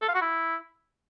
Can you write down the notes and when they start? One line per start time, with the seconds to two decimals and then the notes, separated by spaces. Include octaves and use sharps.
0.02 A4
0.08 F5
0.15 F#4
0.21 E4